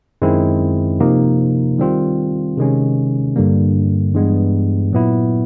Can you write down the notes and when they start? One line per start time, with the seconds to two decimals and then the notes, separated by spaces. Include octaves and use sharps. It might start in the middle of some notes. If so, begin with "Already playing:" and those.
0.22 F#2 D#3 G#3 C4 E4
1.00 C3 F3 A#3 D#4
1.78 D#3 G3 C4 F4
2.57 C3 D#3 G#3 C#4
3.36 G2 D3 G3 A#3
4.14 G2 E3 G#3 B3
4.92 A#2 F#3 B3 E4